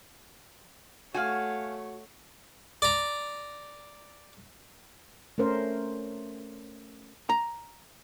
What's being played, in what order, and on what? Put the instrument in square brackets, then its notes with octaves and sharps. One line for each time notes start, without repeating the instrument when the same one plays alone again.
[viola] A3 C#5 [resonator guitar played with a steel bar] F#4 [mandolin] F5 F#5 G#5
[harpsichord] D5 A#5
[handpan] A3 C#4 A#4 C5
[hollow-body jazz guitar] A#5